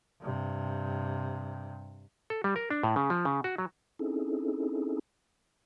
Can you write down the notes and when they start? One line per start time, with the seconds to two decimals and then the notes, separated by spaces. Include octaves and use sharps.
0.21 G2 C3
2.30 A4
2.44 G3
2.56 A#4
2.71 D4
2.83 A2
2.96 C#3
3.10 F3
3.25 C#3
3.44 F#4
3.58 F#3
3.99 C4 C#4 D#4 E4 G#4 A4